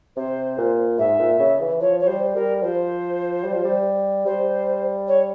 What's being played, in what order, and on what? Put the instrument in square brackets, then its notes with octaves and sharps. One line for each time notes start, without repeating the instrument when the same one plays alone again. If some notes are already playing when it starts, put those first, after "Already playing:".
[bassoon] C3 [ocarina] C5
[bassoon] A#2
[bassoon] G#2 [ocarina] E5
[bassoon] A#2
C#3
E3
[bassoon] F3 [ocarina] C#5
[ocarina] C#5
[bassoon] F3
[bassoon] G3 [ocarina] C5
[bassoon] G3 [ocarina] A#4
[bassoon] F3 [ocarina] C5
[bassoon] G3
F3
G3
[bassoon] G3 [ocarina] C5
[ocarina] C#5